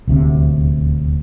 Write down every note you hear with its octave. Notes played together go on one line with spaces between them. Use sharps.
D#1 D2 C3